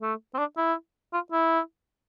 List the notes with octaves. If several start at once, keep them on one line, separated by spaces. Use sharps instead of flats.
A3
C4
D4
E4
F4
E4